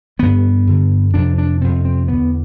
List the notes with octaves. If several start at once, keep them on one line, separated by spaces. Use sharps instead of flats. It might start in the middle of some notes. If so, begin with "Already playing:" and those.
G2 D3 B3
G2 D3
F2 C3 D4
D4
F2 C3 C4
C4
E2 D3 B3